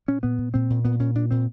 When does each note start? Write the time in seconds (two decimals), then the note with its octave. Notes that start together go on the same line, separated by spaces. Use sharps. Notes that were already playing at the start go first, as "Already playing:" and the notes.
0.08 A#2 C#4
0.23 A#2 B3
0.38 A#2
0.54 A#2 C4
0.70 A#2
0.84 A#2 B3
1.00 A#2 C#4
1.15 A#2 D4
1.31 A#2 C4